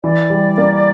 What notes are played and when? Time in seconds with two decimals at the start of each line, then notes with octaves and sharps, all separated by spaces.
0.04 E3 D5
0.30 G3
0.58 A#3